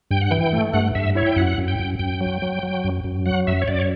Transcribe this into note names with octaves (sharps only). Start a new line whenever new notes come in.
G2 G5
F#5
E3 G5
A3
G2 F#5
G2 E5
E4 C#5
G5
F#2 F#5
F#2
G5
F#2
F#2 G5
F#3
F#3
F#3
F#2
F#2
F#3 F#5
F#2 E5
C#5
F#2 D5
C#5